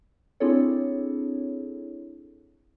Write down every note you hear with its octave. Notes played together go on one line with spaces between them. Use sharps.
C4 D4 E4 G#4 A4 C#5